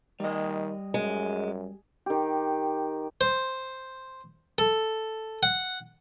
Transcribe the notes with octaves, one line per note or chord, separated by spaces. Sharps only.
D#3 G3 D#5
F#2 G#3
D#3 G4
C5
A4
F#5